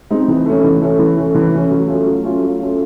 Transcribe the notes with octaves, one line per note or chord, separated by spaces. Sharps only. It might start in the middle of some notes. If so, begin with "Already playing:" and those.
G#3 C4 D#4
E3
A3 C#4
E3
A3 C#4
E3
A3 C#4
E3
A3 C#4
F#3
A3 C#4 F4
F#3
A3 C#4 F4
F#3
A3 C#4 F4